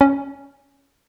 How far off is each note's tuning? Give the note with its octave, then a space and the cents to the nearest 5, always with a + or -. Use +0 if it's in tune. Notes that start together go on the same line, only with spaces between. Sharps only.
C#4 +0 C#5 +25